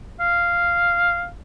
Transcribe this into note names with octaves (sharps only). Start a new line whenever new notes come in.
F5